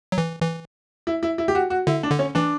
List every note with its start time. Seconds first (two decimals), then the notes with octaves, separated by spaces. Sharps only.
0.12 F#3
0.18 E3
0.42 E3
1.07 E4
1.23 E4
1.38 E4
1.48 G4
1.55 F#4
1.70 F#4
1.87 D3 E4
2.03 D4
2.11 D3
2.19 C#4
2.35 E3 D4